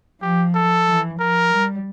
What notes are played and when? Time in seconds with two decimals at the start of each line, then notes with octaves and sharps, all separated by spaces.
0.22 F3 G4
0.55 A4
0.88 E3
1.20 F3 A#4
1.53 G3